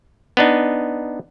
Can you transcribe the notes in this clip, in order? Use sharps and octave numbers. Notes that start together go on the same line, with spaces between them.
B3 D4 D#4